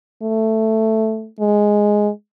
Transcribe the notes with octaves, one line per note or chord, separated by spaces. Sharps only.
A3
G#3